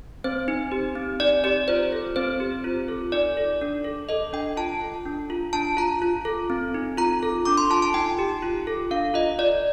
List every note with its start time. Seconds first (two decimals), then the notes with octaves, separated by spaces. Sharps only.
0.24 C4 C5
0.48 D#4
0.72 G4
0.95 C4
1.20 D#4 D5
1.44 G4 D5
1.68 F4 C5
1.92 A4
2.16 C4 C5
2.40 G4
2.64 F4
2.88 A4
3.12 D#4 D5
3.37 A4
3.61 D4
3.84 A4
4.09 A4 D#5
4.33 D4 G5
4.57 F4 A5
4.81 A4
5.05 D4
5.30 F4
5.53 D4 A5
5.77 F4 A#5
6.02 F4
6.25 A4
6.50 C4
6.74 D#4
6.97 F4 A#5
7.23 A4
7.45 D4 D6
7.57 C6
7.70 F4 A5
7.82 A5
7.94 D#4 G5
8.19 G4
8.42 F4
8.67 A4
8.91 D4 F5
9.14 F4 D#5
9.39 F4 D5